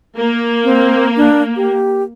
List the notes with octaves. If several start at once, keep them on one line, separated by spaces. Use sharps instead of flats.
A#3
C4
D4
G4